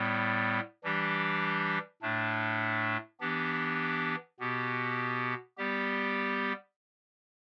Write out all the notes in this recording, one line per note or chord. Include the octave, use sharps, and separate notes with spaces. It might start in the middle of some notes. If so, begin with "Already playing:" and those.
Already playing: A2 G3 B3
E3 G3 D4 G4
A2 A3 D4
E3 B3 D4 G4
B2 B3 G4
G3 B3 G4